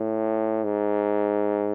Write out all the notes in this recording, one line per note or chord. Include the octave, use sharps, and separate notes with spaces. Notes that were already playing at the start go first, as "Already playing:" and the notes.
Already playing: A2
G#2